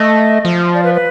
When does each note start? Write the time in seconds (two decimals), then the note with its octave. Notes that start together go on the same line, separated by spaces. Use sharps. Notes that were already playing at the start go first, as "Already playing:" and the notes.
Already playing: A3 D#5
0.45 F3
0.74 D5
0.84 B4
0.94 B4